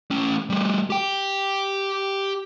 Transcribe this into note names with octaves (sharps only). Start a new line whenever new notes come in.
A3 C#4
G3 A3
G4 G5